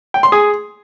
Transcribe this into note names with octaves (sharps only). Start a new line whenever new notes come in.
G5
C6
G#4